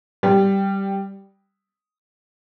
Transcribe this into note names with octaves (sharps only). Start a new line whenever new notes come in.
G3